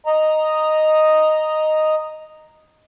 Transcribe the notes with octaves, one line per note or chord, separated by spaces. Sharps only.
D#5 A#5